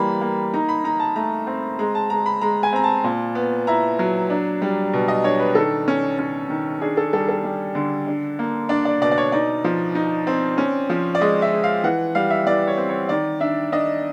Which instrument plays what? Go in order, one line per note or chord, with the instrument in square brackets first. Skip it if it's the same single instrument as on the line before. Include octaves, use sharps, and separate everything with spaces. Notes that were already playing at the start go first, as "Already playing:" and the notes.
Already playing: [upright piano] E3 G3 A#3 B5
A#3
D#4 A#5
B5
D#4 A#5
A5
A3 A#5
C4
G#3 A#5
A5
G#3 A#5
B5
G#3 A#5
G#5
C4 A#5
A5
A#2
B3
E4 A#5
F#3
D4
G3
B2
D#5
D4 C#5
B4
D#3 A4
C#4
C#4
D#3
D4 G#4
A4
G3 A4
A4
G3
D3
D4
A#3
D4 D5
D5
B2 D5
D5
C#5
D#4 D5
F3
D#4
C4
C#4
F3
D5
G#3 D#5
E5
G#3
F5
E3 F#5
G3 F5
E5
E3 D5
C#5
C4
C#5
D#3 D5
D4 E5
D4 D#5